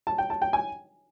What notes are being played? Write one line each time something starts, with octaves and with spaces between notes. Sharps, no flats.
A5
G5
A5
G5
G#5